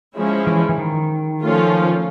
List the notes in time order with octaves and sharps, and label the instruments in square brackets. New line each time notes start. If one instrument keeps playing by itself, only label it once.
[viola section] F3 G#3 C#4 E4 G#4
[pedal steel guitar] E3
E3
D#3
[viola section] F3 A3 C#4 F4